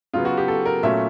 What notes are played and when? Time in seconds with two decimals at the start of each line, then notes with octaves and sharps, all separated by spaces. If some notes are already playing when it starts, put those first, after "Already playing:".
0.13 C#3 F#3 B3 F4
0.25 F#4
0.37 G4
0.48 A4
0.66 A#4
0.83 A#2 F#3 A3 C#4 E5